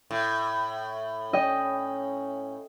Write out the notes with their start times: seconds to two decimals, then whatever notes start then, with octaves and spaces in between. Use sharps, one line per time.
0.11 A2
1.33 C#4 D#5 G5